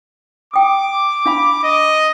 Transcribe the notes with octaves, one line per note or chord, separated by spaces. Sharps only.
G5 D6 D#6
D4 F5 B5
D#5